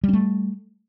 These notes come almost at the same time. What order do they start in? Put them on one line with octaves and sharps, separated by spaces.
G3 C#4 A3